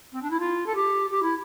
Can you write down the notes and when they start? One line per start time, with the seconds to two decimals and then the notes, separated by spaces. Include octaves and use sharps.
0.12 C4
0.22 D4
0.30 E4
0.39 F4
0.66 A4
0.75 G4
1.10 G4
1.22 E4